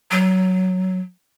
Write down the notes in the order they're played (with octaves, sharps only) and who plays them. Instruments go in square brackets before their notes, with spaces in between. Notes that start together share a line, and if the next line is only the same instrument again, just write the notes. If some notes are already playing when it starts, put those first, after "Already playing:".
[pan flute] F#3